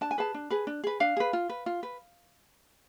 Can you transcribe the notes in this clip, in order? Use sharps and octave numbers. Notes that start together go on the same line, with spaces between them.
D4 A5
G#5
G#4 B4 A5
D4
G#4 B4
D4
G#4 B4
D4 F5
G#4 B4
F4
B4
F4
B4